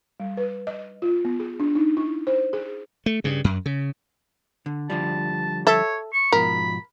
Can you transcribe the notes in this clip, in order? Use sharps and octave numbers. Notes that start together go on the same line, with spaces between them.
G3
B4
D#5
F4
B3
G#4
D4
D#4
E4
C5
G#4
A3
G2 C#3
F#2
C#3
D3
D3 F3 G3 A5
A4 C#5 E5
C#6
G#2 B2 F3 A#4 B5